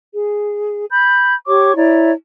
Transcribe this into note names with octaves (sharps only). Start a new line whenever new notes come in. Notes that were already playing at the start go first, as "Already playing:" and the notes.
G#4
B5 G6
G4 C#5 C#6 D6
E4 C#5 D5 A#5